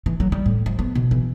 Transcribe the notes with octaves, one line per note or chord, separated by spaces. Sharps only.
E3
F#3
G3
A2
F3
B3
B2
E3